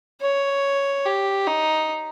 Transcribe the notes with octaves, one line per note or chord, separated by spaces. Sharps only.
C#5
G4
D#4